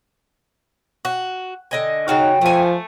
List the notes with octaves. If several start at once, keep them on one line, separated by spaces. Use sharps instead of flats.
F#4
D3 D#5 G#5
C#3 D#4 F#4 F5 G5
F3 A3 G#5